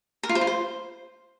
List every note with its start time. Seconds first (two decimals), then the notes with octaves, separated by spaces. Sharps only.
0.23 A#4
0.29 F4
0.35 C5
0.41 F4
0.47 C5